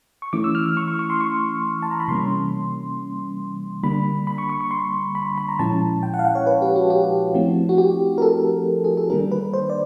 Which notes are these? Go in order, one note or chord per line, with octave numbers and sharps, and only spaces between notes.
C#6
E3 A3 C#4 E4 D6
E6
F6
E6
C#6
C#6
C#6
C6
C#6
A5
A#5
B5
C3 E3 G3 A#3 C#4 C6
D3 G3 A#3 D4 B5
B5
C#6
C#6
C#6
C6
B5
B5
A#5
A#2 F3 G#3 C#4 E4 A5
G5
F#5
F5
F#5
C#5
B4
G4
F#4
G4
F3 A3 C4 E4
F#4
G4
A#4
A4
G#4
A4
D#3 G3 A#3 D4 A#4
B4
C5
D5